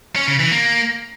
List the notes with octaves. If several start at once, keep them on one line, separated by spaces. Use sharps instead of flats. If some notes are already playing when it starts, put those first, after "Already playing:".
C#4
C#3
E3
A#3